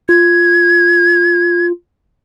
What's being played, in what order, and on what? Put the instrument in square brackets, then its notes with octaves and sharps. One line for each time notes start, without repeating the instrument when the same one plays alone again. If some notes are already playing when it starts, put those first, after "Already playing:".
[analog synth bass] F4 [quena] G#6